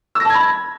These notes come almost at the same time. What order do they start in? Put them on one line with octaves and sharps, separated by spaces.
E6 A#6 A5 G#6 B5